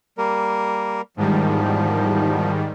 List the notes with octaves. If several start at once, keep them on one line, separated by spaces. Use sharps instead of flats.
G3 A#3 A#4
E2 G#2 D#3 F3 G3